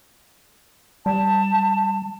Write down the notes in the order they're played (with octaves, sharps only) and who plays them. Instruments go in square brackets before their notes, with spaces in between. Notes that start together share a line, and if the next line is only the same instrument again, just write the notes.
[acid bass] G3 [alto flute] A5